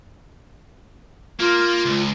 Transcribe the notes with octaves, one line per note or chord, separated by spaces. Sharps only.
A#3 F4
C#2